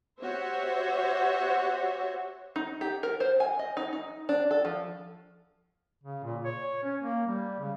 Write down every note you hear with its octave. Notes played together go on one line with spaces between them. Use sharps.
F#4 G4 C5 C#5 E5
D#4
G4
A#4
C5
G#5
D#5
D#4
D#4
D4
A4
F3
C#3
A#2
C#5
C#4
A#3
G3
C#3